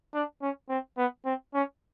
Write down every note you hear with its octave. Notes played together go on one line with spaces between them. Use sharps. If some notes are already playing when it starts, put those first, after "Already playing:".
D4
C#4
C4
B3
C4
C#4